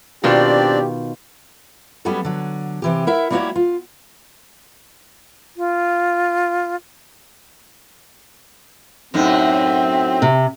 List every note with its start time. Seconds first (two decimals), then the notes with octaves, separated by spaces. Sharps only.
0.24 B2 D#3 C4 D4 F4 G4 D5
2.05 F#3 G3 B3 C#4 F#4 A4
2.25 D3 F#3
2.82 C3 E3 G4
3.07 E4 A#4 E5 F#5
3.30 G3 A#3 E4 F#4 G4 C#5
3.55 F4
5.57 F4
9.14 F#2 A2 C4 D#4
10.22 C3